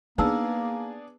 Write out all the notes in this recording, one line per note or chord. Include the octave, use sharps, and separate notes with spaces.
A#3 B3 D4 D#4 G#4 B4 A5 E6